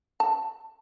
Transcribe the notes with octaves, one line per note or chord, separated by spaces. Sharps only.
A5